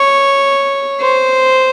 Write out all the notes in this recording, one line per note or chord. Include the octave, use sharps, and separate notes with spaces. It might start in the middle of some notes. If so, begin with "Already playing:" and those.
Already playing: C#5
C5